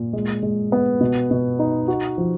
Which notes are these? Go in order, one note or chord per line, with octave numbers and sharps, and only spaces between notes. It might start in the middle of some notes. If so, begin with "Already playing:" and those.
Already playing: A#2
G#3
G#3
B3
B2
B2
D#4
F#4
F3